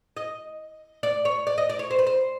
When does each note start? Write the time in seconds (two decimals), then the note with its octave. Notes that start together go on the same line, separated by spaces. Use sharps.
0.17 D#5
1.03 D5
1.25 C#5
1.47 D5
1.58 D#5
1.70 D5
1.79 C#5
1.91 C5
1.99 B4
2.07 C5